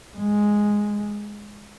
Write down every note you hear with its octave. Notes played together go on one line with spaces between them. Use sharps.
G#3